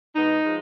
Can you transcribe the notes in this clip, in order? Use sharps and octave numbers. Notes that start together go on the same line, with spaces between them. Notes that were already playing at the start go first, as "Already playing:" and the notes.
B2 G#3 B3 D#4
F3 G#3